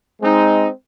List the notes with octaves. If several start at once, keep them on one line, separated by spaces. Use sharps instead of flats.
G#3 C4 D#4